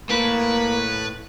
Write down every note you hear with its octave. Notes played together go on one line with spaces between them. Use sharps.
A2 A#3 B4